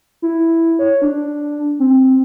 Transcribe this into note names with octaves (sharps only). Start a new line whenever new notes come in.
E4
C#5
D4
C4